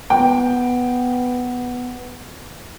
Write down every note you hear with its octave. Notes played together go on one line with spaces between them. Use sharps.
B3 G5